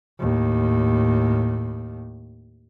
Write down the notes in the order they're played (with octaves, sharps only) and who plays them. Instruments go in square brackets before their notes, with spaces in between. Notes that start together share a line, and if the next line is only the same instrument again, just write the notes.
[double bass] D#2 A2